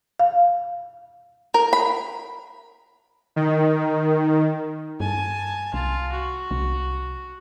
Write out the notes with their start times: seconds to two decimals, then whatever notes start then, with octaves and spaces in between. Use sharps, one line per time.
0.20 F5
1.54 A#4
1.73 B5
3.36 D#3
5.00 G2 G#5 A5
5.74 C2 F4
6.12 F#4
6.51 C2